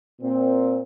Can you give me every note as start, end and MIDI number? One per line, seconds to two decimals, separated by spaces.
0.21 0.81 46
0.21 0.81 60